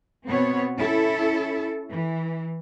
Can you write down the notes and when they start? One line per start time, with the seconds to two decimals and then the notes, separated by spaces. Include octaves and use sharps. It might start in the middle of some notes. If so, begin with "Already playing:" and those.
0.27 B2 B3 C4 C#5
0.76 C#4 E4 A4
1.92 E3